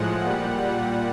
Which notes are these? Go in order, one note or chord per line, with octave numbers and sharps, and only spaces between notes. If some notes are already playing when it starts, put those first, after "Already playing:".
Already playing: A2 F3 G#3 F#5
A#2 G3
A#2 G3